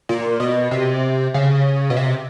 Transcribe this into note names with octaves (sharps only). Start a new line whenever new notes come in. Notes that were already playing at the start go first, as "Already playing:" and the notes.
A#2
B2
C3
C#3
B2
C3